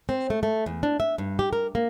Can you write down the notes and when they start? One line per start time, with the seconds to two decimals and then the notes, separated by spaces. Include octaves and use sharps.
0.09 C4
0.30 A3
0.43 A3
0.66 E2
0.83 D4
1.00 E5
1.18 G2
1.39 G4
1.53 A#4
1.75 A#3